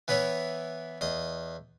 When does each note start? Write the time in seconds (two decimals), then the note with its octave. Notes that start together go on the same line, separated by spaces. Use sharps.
0.08 E3 B3 E4 C#5
1.01 E2 D#5